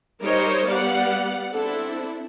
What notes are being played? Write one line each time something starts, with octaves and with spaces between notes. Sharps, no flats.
G3 D#4 A#4 C5 C#5 D#5
G3 B3 D5 F5 F#5
C4 D4 E4 A4